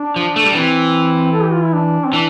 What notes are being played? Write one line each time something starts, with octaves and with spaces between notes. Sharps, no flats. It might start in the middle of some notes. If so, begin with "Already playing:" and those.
Already playing: D4
F3
A3
G3
E3 C4
A4
G4
F4
E4
D4
C4
E3 D4